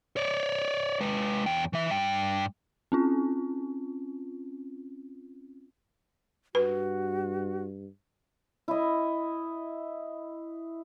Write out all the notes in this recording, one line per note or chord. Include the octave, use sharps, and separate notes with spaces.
C#5 D5
G#3 B4
E2 G5
E3 E5
G2 G5
C4 C#4 F4
G2 F#4 B4
E4 D#5